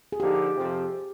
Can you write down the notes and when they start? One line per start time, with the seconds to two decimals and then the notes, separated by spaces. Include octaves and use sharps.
0.12 G#4
0.20 D3 F3 A#3 D#4 G4
0.56 F2 C3 F3 C4